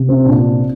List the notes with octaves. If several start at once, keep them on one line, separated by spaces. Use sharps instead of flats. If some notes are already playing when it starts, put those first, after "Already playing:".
Already playing: C3
C4
A#2 D4